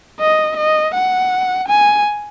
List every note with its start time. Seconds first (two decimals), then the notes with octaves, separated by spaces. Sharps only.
0.20 D#5
0.57 D#5
0.94 F#5
1.68 G#5